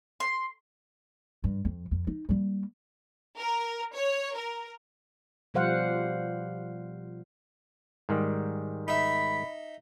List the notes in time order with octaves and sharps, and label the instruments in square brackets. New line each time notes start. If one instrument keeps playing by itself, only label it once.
[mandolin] C6
[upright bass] G2
F2
F2
D#4
G3 A#3
[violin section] A#4
C#5
A#4
[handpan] B2 F3 G3 C5 F5 F#5
[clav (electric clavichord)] G#2 D#3 G3
[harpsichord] D#4 E5 [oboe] B5